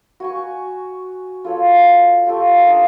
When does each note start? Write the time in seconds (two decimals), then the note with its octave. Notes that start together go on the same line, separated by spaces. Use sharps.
0.20 F#4 G#5 C#6
1.44 F4 A4 C#5 E6
2.26 F4 G4 A4 C#6
2.67 D4 D#4 D#5 F5